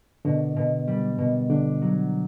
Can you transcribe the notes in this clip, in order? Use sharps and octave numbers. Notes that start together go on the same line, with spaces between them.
B2 D3
B2
G3
B2
D3 D4
F#3